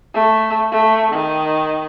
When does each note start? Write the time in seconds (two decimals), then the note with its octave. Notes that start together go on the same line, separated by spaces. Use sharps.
0.14 A3
0.72 A3
1.12 D#3